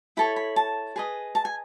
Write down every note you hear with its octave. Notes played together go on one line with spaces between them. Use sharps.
E4 A4 C#5 B5
B5
A5
G#4 B4 D#5
A5
G#5